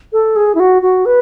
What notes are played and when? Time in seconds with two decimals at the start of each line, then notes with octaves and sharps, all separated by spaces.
0.13 A4
0.36 G#4
0.55 E4
0.60 F#4
0.82 F#4
1.06 B4